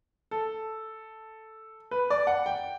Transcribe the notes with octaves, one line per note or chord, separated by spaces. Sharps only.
A4
B4
D5
F#5
G5